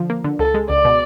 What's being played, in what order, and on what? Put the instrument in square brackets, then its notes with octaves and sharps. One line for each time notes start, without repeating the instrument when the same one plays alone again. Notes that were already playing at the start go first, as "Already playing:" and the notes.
Already playing: [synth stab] D3 F3
A#3
D3
[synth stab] C#2 [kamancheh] A4
[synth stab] G#3
[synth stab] C#2 [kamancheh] D5
[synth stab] B2